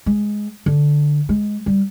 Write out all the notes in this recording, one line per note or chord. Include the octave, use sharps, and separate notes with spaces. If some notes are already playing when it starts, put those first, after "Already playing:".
G#3
D3
G#3
G3